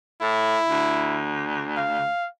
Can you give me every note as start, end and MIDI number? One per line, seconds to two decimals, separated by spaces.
0.22 0.58 45
0.22 1.20 64
0.69 2.09 38
1.78 2.28 77